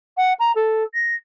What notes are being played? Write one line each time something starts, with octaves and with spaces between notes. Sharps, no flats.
F#5
A#5
A4
A#6